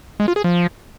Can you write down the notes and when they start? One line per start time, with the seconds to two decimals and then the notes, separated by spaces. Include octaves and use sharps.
0.20 G#3
0.28 F4
0.36 G#4
0.44 F3